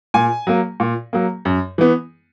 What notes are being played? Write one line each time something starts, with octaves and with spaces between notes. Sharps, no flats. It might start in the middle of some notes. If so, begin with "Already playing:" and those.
A#2 G#5
F#3 A#3
A#2
F#3 A#3
F#2
E3 B3